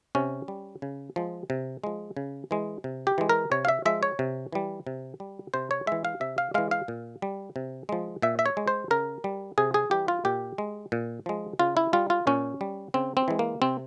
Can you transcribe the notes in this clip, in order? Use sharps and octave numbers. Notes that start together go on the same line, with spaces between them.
C3 C#4
G3
C#3
F3 G#3
C3
F3 G#3
C#3
E3 G#3
C3
G4
E3 G#3
A#4
C3 C#5
F5
E5
F3 G#3 E5
C#5
C3
E3 G3
C3
G3
C3 C5
C#5
E3 G#3 E5
F5
C3 E5
F5
E3 G#3 F5
F5
A#2
G3
C3
F3 G#3
A#2 E5
E5
C#5
G#3
C5
C#3 A#4
G3
C3 G#4
G#4
E3 G3 G4
F4
A#2 G4
G#3
A#2
F3 G#3
C#3 F4
E4
G3 F4
F4
A#2 C#4
G3
C#3 C4
C4
E3 G#3
A#3
C3 C4